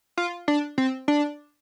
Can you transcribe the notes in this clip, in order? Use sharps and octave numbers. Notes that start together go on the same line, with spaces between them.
F4
D4
C4
D4